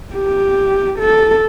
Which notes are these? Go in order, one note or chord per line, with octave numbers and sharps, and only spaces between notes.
G4
A4